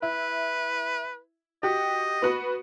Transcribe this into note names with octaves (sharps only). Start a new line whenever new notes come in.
E4 B4
F#4 G4 D#5
B3 F#4 B4